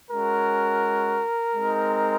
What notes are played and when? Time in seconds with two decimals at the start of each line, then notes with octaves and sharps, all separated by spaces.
0.11 G#3 C#4 F#4 A#4
1.55 G#3 C4 D#4